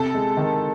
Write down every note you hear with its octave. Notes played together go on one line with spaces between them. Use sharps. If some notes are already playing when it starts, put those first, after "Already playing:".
Already playing: C3 A4
G#3
D#3